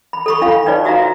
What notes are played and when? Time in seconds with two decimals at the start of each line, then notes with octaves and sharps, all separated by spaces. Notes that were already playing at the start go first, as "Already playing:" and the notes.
0.13 B5
0.26 A4 B5 C#6
0.41 D4 F4 F5 B5
0.66 D4 D#4 B4 C#5 D5
0.85 F#4 E5 F5 A#5